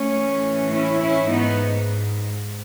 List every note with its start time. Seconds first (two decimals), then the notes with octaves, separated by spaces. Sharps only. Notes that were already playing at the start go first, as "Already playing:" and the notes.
Already playing: A3 C#4
0.12 A2 E3
0.70 C#4 E4
0.99 C#4 E4
1.28 G#2 B3 D#4